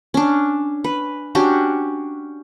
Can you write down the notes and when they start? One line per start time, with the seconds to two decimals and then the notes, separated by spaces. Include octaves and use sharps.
0.14 C#4 D4
0.84 B4
1.35 C#4 D4 F#4 G4